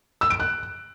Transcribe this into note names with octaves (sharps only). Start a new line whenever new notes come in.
E6
D7
F#6